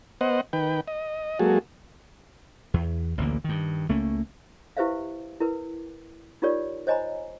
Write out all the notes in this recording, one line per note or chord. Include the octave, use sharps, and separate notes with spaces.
B3 C5 D#5 F#5
D#3 B4 G5
D#5
F#3 G#3 A#3 F#4 G#4 A4
E2
A1 D2 D3 A#3
G2 D#3
C#2 A3 A#3 C#4
E4 G4 B4 C5 E5 F5
E4 A#4 B4
D#4 F4 G4 A#4 C#5 D5
C5 C#5 D#5 G#5 A#5 B5